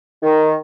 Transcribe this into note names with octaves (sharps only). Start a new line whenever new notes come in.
D#3